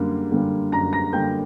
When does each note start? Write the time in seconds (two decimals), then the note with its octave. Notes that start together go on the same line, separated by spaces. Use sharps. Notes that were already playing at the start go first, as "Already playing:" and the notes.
Already playing: F#2 D3 G3 A#3
0.31 D3 G3 A#3
0.72 F#2 A#5 A#6
0.93 A#5 A#6
1.13 D3 G3 A#3 G5 G6